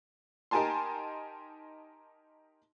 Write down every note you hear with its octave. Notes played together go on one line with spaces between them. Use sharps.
D#4 G4 A#4 G#5 A5 C6